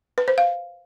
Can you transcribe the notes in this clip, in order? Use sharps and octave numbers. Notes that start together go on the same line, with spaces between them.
B4
C5
F5